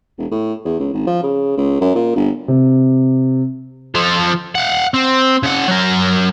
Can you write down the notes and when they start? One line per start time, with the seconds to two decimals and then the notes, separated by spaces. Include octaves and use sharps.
0.18 E1
0.32 A2
0.65 E2
0.79 C#2
0.93 G#1
1.07 F3
1.23 C#3
1.57 C#2
1.81 F#2
1.95 A#2
2.16 G1
2.48 C3
3.95 F3 A4
4.55 F5 F#5
4.94 C4
5.43 C#3 F#5
5.68 F#3 A#4